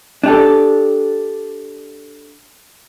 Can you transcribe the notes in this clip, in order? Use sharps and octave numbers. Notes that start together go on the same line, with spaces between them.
D4 G4 A4